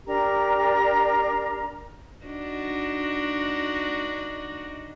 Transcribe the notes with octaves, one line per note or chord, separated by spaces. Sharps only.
D4 G4 A#4 A#5
D4 D#4 F#4